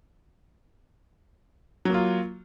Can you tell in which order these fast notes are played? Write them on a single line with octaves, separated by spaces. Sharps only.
F#3 A#3 F4